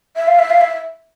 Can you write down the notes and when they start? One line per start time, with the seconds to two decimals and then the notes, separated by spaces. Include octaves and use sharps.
0.16 E5
0.27 F5
0.39 E5
0.50 F5
0.61 E5